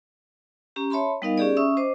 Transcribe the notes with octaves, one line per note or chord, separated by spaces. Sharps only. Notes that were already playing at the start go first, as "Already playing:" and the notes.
C#4 G4 A#5
C#5 E5 A5 B5 C6
G3 B3 D#4 A#4 D#5 F5
C#4 G4 G#4 D5
C#4 E5 C#6 D#6 E6
C5 D#5 D6